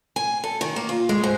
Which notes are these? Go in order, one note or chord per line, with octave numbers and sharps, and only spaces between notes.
G#5
A4
D#3
A#3
F4
G#3
G#2